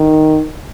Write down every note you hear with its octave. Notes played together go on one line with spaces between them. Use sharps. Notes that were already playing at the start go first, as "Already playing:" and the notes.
Already playing: D#3